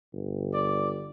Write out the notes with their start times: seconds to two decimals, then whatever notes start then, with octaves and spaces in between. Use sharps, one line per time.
0.13 G1
0.54 D5